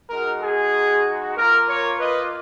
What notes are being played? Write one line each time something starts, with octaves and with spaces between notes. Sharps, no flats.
G#3 D#4 F#4 A#4
G#4
A#3 F4 A#4
A#4 C#5
B4 D#5